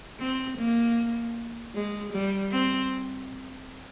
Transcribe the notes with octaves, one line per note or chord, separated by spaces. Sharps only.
C4
A#3
G#3
G3
C4